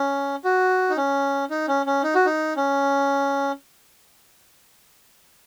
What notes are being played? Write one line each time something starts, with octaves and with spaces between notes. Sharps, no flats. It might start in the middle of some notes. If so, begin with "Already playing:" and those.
Already playing: C#4
F#4
D#4
C#4
D#4
C#4
C#4
D#4
F#4
D#4
C#4